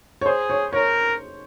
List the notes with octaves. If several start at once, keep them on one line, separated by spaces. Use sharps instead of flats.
C#5
G#4 C5
C#5
A#4 C#5